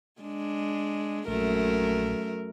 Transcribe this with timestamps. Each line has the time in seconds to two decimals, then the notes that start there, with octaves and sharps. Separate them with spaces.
0.21 G#3 D4
1.28 A#1 F#2 A3 A#4